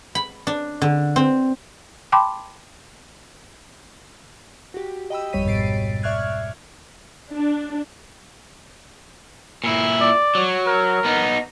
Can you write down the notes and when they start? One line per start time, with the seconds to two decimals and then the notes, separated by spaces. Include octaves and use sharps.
0.15 B5
0.47 D4
0.82 D3
1.16 C4
2.12 G5 A5 B5 C6 D6
4.74 F#4 G4
5.10 D#5 G5 B5 E6
5.33 G#1 F2 G3 C#5 B6 D#7
5.46 G#2 B2 A6 C7 D7
6.03 D5 E5 C#6 F6 F#6 G#6
7.32 D4
9.64 A#2 E4
10.01 D5
10.35 F#3
10.67 A#4
11.05 B3 D#4